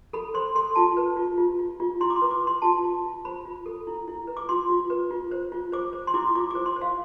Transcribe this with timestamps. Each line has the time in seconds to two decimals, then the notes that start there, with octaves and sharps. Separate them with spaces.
0.13 A4 B5
0.34 C5 C6
0.55 A4 C6
0.75 F4 A5
0.97 B4
1.17 F4
1.38 F4
1.59 F4
1.80 F4
2.01 E4 C6
2.10 D6
2.16 C6
2.22 B4
2.31 D6
2.41 B4
2.47 C6
2.62 F4 A5
2.83 F4
3.04 F4
3.25 C5 B5
3.46 F4
3.66 A4
3.87 E4
4.08 E4
4.27 B4
4.37 D6
4.49 F4 C6
4.70 F4
4.90 B4
5.11 F4
5.31 C5
5.52 F4
5.72 C5 D6
5.93 C5
6.07 C6
6.14 E4 D6
6.35 F4 D6
6.51 C5 D6
6.66 C6
6.76 C5
6.81 F5